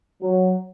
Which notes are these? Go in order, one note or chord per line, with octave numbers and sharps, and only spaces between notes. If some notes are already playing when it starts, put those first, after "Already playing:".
F#3